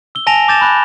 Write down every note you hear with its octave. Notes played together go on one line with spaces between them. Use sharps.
E6 G7
G#5 A5 A#6 D7 F7
D6 G6 A6 E7
B5 F#6